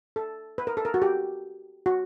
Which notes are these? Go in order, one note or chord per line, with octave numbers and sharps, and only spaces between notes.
A4
B4
A#4
A4
A#4
F#4
G4
F#4